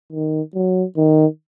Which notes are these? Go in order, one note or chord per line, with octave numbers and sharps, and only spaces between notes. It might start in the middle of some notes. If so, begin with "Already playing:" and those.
D#3
F#3
D#3